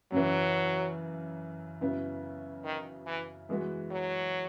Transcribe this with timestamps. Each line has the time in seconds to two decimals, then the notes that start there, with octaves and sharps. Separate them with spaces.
0.12 F#2 C#3 E3 F#3
1.81 F#2 C#3 F#3 B3 E4
2.64 D#3
3.06 E3
3.49 E3 G#3 B3 F#4
3.91 F#3